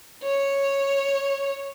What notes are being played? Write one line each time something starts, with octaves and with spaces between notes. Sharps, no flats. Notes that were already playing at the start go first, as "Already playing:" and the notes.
C#5